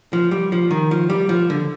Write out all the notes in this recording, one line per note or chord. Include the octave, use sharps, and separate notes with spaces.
F3
G3
F3
D#3
F3
G3
F3
D3